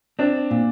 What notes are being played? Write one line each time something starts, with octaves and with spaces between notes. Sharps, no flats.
C4 D4
A#2